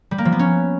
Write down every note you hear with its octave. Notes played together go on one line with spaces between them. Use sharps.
G3
A#3
F3
B3
C#4